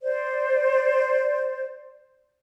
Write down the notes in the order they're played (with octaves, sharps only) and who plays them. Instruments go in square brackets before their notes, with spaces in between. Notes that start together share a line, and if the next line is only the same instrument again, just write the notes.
[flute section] C5 D5